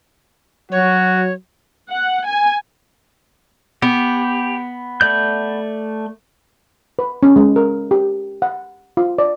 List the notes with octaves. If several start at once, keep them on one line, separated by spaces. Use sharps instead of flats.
F#3 F#4 C#5
F#5
G#5
B3 G4
A3 D5 G6
B4
C#4
G#3
A#4
G4
F#5
F4
D5